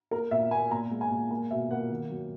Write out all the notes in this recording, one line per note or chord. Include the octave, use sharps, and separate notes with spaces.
A#3 A#4
A#2 E5
A#3 G#5
A#2 A#5
G#3
G#5
A#2
A#3 G#5
B2 E5
A#3 F#5
D#3
F#3